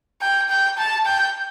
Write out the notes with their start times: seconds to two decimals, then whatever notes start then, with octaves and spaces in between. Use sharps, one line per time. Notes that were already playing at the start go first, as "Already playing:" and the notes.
0.21 G5
0.49 G5
0.78 A5
1.06 G5